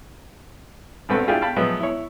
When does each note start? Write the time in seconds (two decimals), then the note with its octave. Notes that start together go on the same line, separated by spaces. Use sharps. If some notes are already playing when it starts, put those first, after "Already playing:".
1.09 G#1 G2 C4 A4 B4 F#5
1.28 D4 E4 F4 G4 G#4 F5
1.41 F5 G5 A5 B5
1.56 F3 F#3 G#3 B3 E5
1.80 E4 C#5